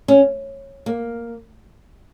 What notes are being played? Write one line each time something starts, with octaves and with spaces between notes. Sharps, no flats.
C#4
A#3